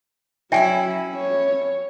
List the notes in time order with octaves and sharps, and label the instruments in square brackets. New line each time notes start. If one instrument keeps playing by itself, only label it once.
[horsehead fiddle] F#3 [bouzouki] C#4 D#4 E4 [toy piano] E5 G5 G#5
[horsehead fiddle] C#5